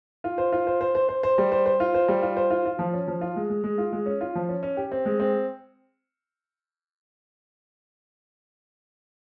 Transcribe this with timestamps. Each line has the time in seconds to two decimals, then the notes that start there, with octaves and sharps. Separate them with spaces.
0.24 F4
0.38 C5
0.52 F4
0.67 C5
0.81 C5
0.95 C5
1.09 C5
1.23 C5
1.38 G3
1.52 C5
1.66 C5
1.80 F4
1.94 C5
2.08 G3
2.22 F4
2.37 C5
2.50 F4
2.65 F4
2.79 F3
2.93 C#4
3.08 F3
3.21 F4
3.36 G#3
3.50 G#3
3.64 G#3
3.78 F4
3.92 G#3
4.06 C#4
4.21 F4
4.35 F3
4.49 C#4
4.63 C#4
4.77 G4
4.92 C4
5.05 G#3
5.20 C4